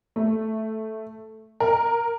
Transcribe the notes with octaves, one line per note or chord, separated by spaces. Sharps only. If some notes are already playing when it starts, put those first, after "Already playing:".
A3
A#4